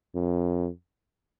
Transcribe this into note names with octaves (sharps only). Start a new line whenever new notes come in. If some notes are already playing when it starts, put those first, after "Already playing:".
F2